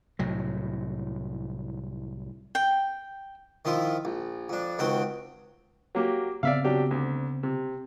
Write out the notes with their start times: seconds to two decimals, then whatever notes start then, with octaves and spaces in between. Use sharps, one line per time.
0.19 C2 A2 F#3
2.55 G5
3.65 D#3 F3 E4 F4
4.05 A#1
4.49 F2 D4
4.79 C#2 D#3 C4 F#4 G5
5.95 F#3 A#3 G4
6.43 C#3 B3 C4 D5 E5 F5
6.64 F#3 D4 G4
6.91 D2
7.43 C3